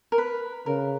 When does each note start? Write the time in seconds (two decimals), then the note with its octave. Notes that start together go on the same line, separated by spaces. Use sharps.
0.12 A#4
0.18 B4
0.66 C#3 A#4